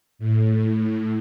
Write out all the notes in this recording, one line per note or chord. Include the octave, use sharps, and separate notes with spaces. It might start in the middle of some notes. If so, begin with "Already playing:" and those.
A2